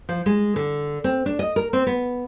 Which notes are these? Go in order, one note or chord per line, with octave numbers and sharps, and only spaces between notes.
F3
G#3
D3
C4
D4
D#5
A#4
C4
B3